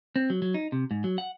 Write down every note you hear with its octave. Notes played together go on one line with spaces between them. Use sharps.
C4
F#3
F#3
D#4
C3
G#2
F#3
F#5